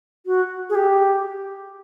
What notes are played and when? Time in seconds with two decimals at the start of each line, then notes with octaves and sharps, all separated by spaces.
0.26 F#4
0.69 G#4
0.75 G4